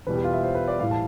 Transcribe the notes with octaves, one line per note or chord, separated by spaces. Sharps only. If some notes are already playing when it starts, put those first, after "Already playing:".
E2 B2 G3 B4
G4
F4
E5
C5
B4
D5
A2 E3 G3 F5
A5